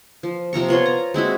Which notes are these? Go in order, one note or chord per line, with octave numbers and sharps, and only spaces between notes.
F3
C3 F3 A#5 C#6
B3 F4 C#5 C6
A#5
G#3 C4 E4 F#4